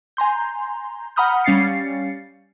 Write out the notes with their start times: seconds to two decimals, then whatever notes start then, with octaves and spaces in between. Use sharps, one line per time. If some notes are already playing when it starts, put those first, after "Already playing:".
0.17 G#5 A#5 C6 G6
1.16 F#5 A#5 B5 D#6 F6 G6
1.44 G3 C#4 F5 A6 C7 C#7